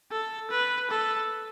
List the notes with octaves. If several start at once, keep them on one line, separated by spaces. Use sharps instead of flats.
A4
B4
A4